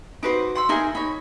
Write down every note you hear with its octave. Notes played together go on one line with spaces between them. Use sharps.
D#4 F#4 B4 C5 D6
F#5 C6 E6
D#4 E4 G#4 A#4 A#5
D#4 C#5 B5